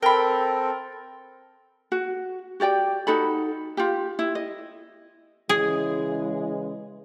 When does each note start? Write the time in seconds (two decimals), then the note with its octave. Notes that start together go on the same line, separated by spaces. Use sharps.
0.03 C4 A4 A#4 G5 B5
1.92 F#4
2.60 F#4 G4 D5 G5
3.07 D#4 F#4 A4 B5
3.77 F4 G4
4.19 E4
4.35 D#5
5.49 C#3 E3 G#3 G#4